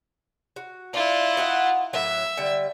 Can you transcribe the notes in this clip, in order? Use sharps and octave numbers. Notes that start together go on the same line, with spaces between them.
F#4
D4 E4 F4
D#4 F#4 F#5
A2 F#3 E5
D3 G3